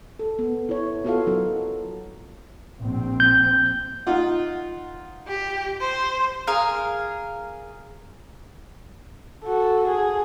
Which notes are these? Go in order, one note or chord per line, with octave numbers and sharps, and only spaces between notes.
A4
B3
E4 C#5
B3 F4 F#4 A4 C#5 F5
F#3 D#4 A#4
A#1 C4
G6
D#4 F4 F#5
G4
C5
G#4 A#4 F5
F#4 A4
G#4